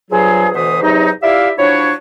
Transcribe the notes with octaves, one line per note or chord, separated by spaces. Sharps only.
G2 F3 F#3 F4 G#4
D2 B2 E3 B4 C5 D#6
E2 C3 F#3 D#4
E4 F4 G4 D5 E5 F5
F3 F#3 D4 E4 C#5